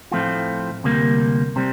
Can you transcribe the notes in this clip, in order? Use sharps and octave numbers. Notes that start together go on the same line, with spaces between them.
A2 F3 A3 C4 F4
D2 C3 G3 A#3
C3 G3 C4